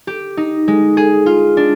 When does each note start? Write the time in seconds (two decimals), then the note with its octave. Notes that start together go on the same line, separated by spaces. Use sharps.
0.07 G4
0.37 D#4
0.68 G#3
0.97 G#4
1.26 F4
1.57 D4